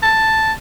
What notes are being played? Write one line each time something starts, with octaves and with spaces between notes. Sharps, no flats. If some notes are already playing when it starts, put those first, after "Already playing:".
A5